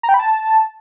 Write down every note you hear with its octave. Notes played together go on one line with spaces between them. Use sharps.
A#5
G5
B5
A5